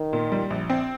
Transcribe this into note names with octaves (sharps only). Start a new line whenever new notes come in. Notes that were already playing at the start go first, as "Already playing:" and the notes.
Already playing: D#3
A#2
G3
A#1
C4